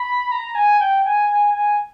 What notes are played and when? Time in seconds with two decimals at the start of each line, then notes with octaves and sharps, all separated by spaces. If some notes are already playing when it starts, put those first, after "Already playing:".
Already playing: B5
0.31 A#5
0.55 G#5
0.79 G5
1.04 G#5
1.29 G#5
1.54 G#5